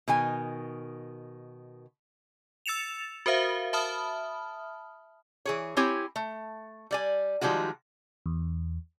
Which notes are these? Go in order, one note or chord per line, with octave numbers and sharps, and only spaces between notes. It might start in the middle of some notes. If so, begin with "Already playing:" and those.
B2 D#3 G#5
E6 A6 C#7 E7 F7
F#4 A#4 C5 E5 F5
E5 A5 B5 D#6 F6
E3 G#4 C#5
C4 E4 G4 C#5 G#5
A3
G3 D5 G#5
D#3 F3 G3 G#3 F#4
E2